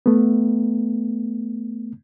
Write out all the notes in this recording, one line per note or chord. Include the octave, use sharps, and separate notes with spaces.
A3 B3